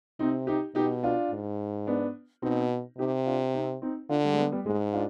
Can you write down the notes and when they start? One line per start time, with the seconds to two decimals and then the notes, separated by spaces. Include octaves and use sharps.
0.19 C3 C4 D#4
0.47 D#4 G4
0.75 B2 D#4 G4
1.03 D4 F4
1.31 G#2
1.87 B3 D4
2.42 B2 C4 D#4
2.98 C3 D#4 G4
3.26 D4 F4
3.54 C4 D#4
3.82 C4 D#4
4.09 D3 D4 F4
4.24 G3
4.33 G#3
4.37 G3 B3
4.51 G3 B3
4.66 G#2 G#3
4.93 D4 F4